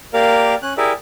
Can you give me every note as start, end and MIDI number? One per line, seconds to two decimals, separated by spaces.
0.14 0.55 58
0.14 0.55 67
0.14 0.55 70
0.14 0.55 74
0.14 0.55 77
0.62 0.73 61
0.62 0.73 90
0.77 0.93 64
0.77 0.93 67
0.77 0.93 68
0.77 0.93 70
0.77 0.93 74
0.77 0.93 76